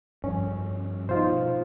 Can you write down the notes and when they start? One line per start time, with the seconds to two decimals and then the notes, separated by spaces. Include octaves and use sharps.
0.24 G2 F3 C#4
1.09 B2 B3 D#4 F4 C5